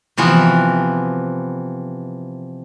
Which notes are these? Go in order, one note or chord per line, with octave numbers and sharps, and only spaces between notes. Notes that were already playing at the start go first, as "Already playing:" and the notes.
C3 E3 F3 B3 F#4